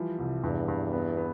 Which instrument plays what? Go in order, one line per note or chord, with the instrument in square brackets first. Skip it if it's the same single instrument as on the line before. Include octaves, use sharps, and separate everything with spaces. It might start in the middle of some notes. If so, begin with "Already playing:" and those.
Already playing: [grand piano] E3 F3 G3
C2
[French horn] E2 [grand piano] G2
[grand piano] G2
B3
B3